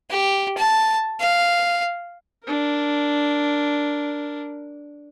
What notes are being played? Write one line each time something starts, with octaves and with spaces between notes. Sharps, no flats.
G4
A5
F5
D4 A#4